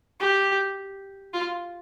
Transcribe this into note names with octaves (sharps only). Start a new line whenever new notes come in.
G4
F4